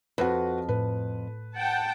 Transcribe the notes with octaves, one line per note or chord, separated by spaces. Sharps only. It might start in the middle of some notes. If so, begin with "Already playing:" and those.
F2 F#4 B4
A2 B4
F#5 G5 A5